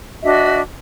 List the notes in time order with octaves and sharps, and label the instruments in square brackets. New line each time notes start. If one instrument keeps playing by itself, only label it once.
[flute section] D4 F#4 D#5 E5